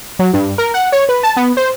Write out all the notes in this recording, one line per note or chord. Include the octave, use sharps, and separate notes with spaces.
F#3
G2
A#4
F#5
C#5
B4
A5
B3
C5